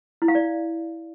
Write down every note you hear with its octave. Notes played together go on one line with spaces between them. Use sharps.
E4
F5
D5